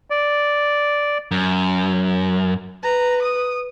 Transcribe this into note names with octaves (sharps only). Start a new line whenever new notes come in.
D5
F#2
B4 A#5
D#6